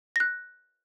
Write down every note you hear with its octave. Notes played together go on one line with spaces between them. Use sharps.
F#6 A#6